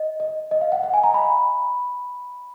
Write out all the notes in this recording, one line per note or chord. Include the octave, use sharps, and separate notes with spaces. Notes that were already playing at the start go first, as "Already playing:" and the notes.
Already playing: D#5
D#5
D#5
F5
F#5
F#5
G#5
A#5
B5